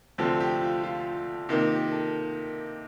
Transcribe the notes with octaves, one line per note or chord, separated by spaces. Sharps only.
D2 C3 F3 C4 A4
G4
F4
F4
C3 D#3 A#3 F4
G4
A4